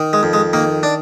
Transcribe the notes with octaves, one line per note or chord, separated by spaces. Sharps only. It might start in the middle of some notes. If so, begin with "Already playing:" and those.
Already playing: D#3
G#3
F2
G#3
D#3 A#3
D4